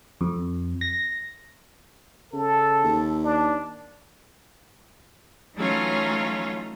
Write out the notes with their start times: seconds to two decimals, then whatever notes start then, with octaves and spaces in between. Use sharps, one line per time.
0.21 F2
0.81 A#6
2.33 C#3 A4
2.84 D#2
3.24 D4
5.56 E3 F#3 A3 C#4 D#4 F4